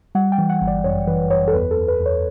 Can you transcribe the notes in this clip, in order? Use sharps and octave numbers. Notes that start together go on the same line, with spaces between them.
G3 F#5
G5
E3
F#5
G1
D5
F#2 C#5
E3 B4
F#2 C#5
A4
E2 B4
A4
E2
B4
E2
C#5